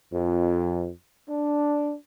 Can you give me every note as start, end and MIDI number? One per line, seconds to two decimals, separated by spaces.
0.12 0.90 41
1.29 1.94 62